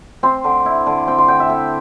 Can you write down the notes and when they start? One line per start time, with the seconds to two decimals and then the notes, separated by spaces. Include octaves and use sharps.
0.23 C4 C6
0.44 D3
0.65 E4
0.87 D3
1.07 C4 G5
1.18 C6
1.28 D3 G5
1.40 E5
1.49 E4 A4